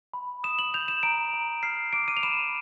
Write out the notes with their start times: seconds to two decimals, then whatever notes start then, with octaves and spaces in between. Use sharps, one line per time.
0.14 B5
0.44 D#6 E7
0.59 F#7
0.74 G6 F7
0.88 E7
1.03 A#5 D7
1.33 A#5
1.63 F6 C7
1.93 D6 D7
2.08 D#7
2.17 F7
2.23 B5 E7